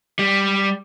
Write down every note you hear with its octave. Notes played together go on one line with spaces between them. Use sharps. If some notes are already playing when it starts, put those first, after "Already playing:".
G3